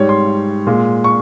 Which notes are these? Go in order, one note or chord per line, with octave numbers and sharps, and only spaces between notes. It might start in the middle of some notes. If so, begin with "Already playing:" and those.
Already playing: G#2 G3 C#5
C6
A#2 G#3
C#6